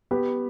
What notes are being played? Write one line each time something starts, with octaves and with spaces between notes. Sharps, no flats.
B3 G4 B4